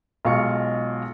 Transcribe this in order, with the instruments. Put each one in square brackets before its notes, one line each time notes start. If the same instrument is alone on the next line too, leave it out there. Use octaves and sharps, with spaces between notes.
[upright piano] B1 G#3 F4 F5 C#6 C#7